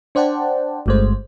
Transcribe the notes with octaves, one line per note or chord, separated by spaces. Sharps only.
D4 C5 D5 F#5 G5 A5
G1 G2 G#3 A3 C5